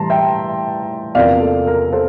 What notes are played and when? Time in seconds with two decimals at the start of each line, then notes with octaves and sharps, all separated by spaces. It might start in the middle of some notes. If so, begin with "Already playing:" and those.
Already playing: A2 E3 G3 A5 A#5 C6
0.10 E5 G5
1.15 E2 C3 F3 A#3 D5 F5
1.40 A4
1.67 A#4
1.92 A4 C5